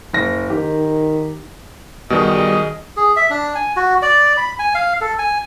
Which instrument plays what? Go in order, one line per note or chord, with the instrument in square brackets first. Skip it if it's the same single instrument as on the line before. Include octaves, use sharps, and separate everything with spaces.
[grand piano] F#1 A#6
[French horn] D#3 [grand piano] G4
[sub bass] F#1 [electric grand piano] B2 D#3 [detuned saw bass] G3 [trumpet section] G#4 D#5
[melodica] G#4
E5
D4
G#5
F#4
D5
B5
G#5
F5
A4
G#5